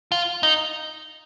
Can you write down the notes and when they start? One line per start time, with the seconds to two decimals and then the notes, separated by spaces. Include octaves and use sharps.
0.12 F4
0.43 D#4